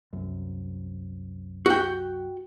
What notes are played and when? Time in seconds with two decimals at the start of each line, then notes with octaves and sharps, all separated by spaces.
0.13 C2 F#2
1.66 F#4 G5